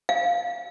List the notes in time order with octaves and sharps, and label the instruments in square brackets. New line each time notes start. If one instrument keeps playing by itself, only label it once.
[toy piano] F5